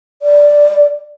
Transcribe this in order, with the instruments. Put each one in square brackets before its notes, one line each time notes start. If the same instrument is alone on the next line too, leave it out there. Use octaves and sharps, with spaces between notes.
[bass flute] D5